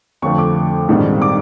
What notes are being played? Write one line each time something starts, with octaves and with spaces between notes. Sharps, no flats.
F2 D3 F3 A3 C#6
D6
A#1 G#2 D#3 G3 C4
D6